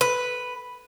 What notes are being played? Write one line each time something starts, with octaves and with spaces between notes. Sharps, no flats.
B4